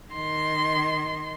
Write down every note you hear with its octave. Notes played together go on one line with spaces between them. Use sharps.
D#3 C6